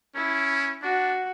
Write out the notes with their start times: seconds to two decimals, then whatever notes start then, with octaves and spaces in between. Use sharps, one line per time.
0.15 C#4 E4
0.82 D4 F#4